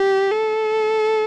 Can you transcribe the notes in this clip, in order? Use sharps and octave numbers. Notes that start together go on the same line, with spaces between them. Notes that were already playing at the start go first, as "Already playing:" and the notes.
Already playing: G4
A4